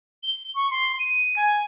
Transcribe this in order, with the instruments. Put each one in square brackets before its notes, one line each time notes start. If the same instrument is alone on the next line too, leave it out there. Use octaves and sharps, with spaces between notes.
[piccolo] G7
C#6
C6
D#7
G#5